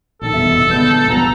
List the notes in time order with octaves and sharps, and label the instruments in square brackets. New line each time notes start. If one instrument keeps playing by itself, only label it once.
[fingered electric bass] A#1 A#2 D#3 [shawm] A4
[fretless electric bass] F1 E2 G2 [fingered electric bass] B2 E3 [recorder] E5
[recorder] E6
[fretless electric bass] D#1 B3 [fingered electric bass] B1 D3 G#3 [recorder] G6
[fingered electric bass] F1 F3 G3 [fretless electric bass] B1 B3 [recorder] A#5